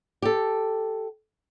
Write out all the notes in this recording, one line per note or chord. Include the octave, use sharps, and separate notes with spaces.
G4 A4